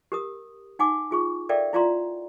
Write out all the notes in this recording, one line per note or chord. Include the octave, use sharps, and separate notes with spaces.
G4 A#4 D#6
D#4 F#5 G#5 D6
F4 G#4 C#6
A4 A#4 D5 E5 F5 G5
E4 F4 D5 F5 A#5 C6